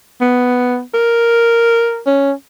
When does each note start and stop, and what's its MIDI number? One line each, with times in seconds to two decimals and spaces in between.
0.21 0.81 59
0.94 2.01 70
2.06 2.32 61